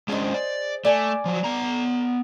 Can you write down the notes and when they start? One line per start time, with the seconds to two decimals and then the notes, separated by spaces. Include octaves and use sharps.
0.08 G#3 C#4 D4 G#4 C5 D#5
0.34 D5
0.85 A3 D5 G#5
1.25 F3 F#3
1.44 B3 A#5